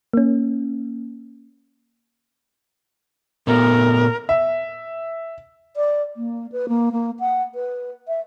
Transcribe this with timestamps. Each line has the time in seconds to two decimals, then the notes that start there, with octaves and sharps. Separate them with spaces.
0.13 A#3 C#4
3.47 A#2 A3 B3 A#4
4.29 E5
5.76 D5
6.16 A#3
6.52 B4
6.69 A#3
6.92 A#3
7.19 F#5
7.55 B4
8.08 E5